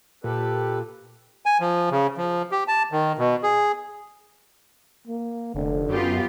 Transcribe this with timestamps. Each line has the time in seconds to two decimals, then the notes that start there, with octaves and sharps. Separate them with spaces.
0.24 A#2 G4 A4 B4
1.46 G#5
1.60 F3
1.91 C#3
2.17 F3
2.51 G4
2.68 A5
2.92 D#3
3.18 B2
3.43 G#4
5.07 A#3
5.55 F1 D3
5.89 F#2 B3 F4 G4